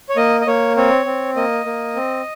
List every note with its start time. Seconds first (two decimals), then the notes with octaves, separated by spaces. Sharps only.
0.09 C#5
0.16 A#3 D#5
0.41 D#5
0.47 A#3 C#5
0.77 C4 C#5
1.06 C4
1.36 A#3 D#5
1.66 A#3
1.95 C4